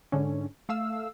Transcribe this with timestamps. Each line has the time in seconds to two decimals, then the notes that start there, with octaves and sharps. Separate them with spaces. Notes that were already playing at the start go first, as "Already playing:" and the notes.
0.12 G#2 D3 C#4
0.69 A3 F5 E6